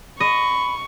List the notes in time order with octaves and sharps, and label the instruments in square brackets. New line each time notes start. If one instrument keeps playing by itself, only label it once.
[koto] D#5 [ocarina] B5 [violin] C#6